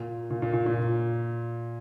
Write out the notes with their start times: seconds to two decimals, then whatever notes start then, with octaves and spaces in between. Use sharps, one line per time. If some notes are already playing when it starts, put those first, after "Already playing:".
Already playing: A#2
0.30 A#2
0.42 A#2
0.53 A#2
0.66 A#2